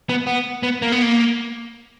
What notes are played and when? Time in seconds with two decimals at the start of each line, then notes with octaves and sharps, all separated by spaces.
0.09 B3
0.27 B3
0.63 B3
0.82 A#3
0.92 B3
1.02 A#3